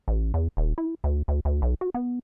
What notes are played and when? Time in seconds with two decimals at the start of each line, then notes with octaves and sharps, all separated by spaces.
0.08 A1
0.34 E2
0.57 D#1
0.78 E4
1.04 D2
1.28 D2
1.45 D2
1.62 B1
1.81 F#4
1.94 B3